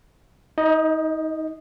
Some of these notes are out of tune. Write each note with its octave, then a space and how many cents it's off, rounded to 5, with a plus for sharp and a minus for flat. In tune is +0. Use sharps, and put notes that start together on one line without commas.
D#4 +30 D#5 -10